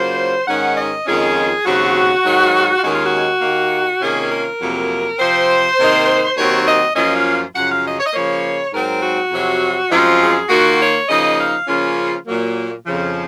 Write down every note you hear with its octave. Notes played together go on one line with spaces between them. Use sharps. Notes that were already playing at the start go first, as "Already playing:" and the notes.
Already playing: C#3 F#3 A#3 F4 C5
G#2 D#3 G#3 C#4 F#5
D#5
F2 D#3 G#3 C#4 F4 G#4
D#2 C#3 F#3 C4 F#4
G#2 D#3 F#3
D#2 D#3 G#3 C#4 F#4
F4
F#4
D#2 D#3 A#3
C3 D#3 A#3 C#4 F4 G#4
A#4
F2 C3 F#3 A#3
C3 F3 C4 C5
C3 D#3 A#3 D#4
D#2 D#3 F#3 C4 C#5
D#5
F#2 F3 A#3 C#4 F4 D#5
F5
F#2 C#3 F3 F#5
F5
D#5
C#5
D#5
C#3 F3 A#3 C#5
G#2 F#3 C4 A#4
F#4
F2 C3 F#3
F#2 F3 G#3 C4 F4
G#4
D#3 A#3 F4 F#4
C#5
C#3 F3 A#3 D#4 D#5
F5
C#3 F3 A#3 C#4 F4
A#2 F#3 A#3
F2 C#3 F3